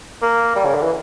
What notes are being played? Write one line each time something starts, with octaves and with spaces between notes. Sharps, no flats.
A#3
G3
C#3
D3
E3